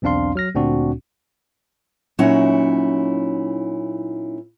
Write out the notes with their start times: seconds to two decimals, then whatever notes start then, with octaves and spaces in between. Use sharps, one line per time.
0.02 B1 E2 C4 D4 F5 C6
0.35 F#3 F6 A#6
0.55 D2 A#2 C4 D4 F#4
2.19 A#2 F#3 C#4 D#4 E4 F#5